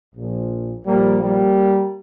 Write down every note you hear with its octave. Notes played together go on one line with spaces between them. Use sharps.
A#1 A#2 F3
A#1 A#2 F3 G3 A#3
G3 A#3